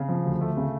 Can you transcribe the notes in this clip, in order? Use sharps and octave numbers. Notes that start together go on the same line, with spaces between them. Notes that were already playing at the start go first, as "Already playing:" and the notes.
Already playing: C#3
F3
D2
A3
C#3